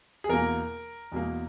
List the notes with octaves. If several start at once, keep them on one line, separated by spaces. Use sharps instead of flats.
G#4
E2 B2 A#3 A#4
E2 B2 A#3